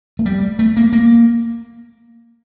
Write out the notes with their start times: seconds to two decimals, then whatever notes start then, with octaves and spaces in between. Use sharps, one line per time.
0.19 A3
0.26 G3
0.59 A3
0.77 A#3
0.93 A#3